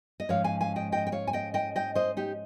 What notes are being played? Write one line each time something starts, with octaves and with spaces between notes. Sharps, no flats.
D#5
G#2 F3 G#3 C#4 C#5 F5
F5 G#5
F5 G#5
D#5 G5
D#5 G5
G5
C#5 F5
G#5
D#5 G5
D#5 G5
D#5 G5
C5 D#5
D#4 G4